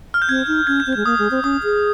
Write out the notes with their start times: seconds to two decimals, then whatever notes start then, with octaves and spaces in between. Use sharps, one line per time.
0.14 F6
0.22 G6
0.29 C4 G#6
0.47 D#4
0.67 C#4 G#6
0.80 G6
0.87 C4
0.93 G#3 G6
1.06 A#3 D#6
1.19 G#3
1.31 C4
1.43 C#4 D#6
1.63 G#4